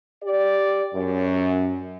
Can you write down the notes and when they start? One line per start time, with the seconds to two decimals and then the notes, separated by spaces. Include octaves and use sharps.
0.23 G4 D5
0.94 F#2